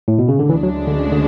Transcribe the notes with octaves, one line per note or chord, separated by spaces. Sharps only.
A2
B2
C#3
D3
D2 C#3 E3 G#3 D4
F#3
D3
D3